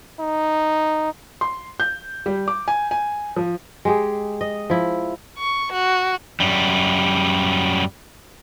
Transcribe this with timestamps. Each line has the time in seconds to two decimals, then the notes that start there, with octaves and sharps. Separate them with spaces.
0.20 D#4
1.41 C6
1.80 G6
2.26 G3
2.48 D6
2.68 G#5
2.91 G#5
3.36 F3
3.85 G#3 G4 G#4
4.41 D#5
4.70 F3 E4
5.38 C#6
5.73 F#4
6.40 F#2 G3